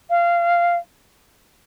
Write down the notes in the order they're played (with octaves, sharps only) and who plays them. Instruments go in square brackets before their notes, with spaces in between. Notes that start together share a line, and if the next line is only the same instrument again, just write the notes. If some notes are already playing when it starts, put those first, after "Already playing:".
[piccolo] F5